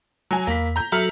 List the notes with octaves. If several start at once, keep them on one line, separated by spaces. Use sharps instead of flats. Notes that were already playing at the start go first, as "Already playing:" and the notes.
F#3 G#5
E2 A#3 B6
A#5 G6
F#3 F#4 A4 E5 A#5 F6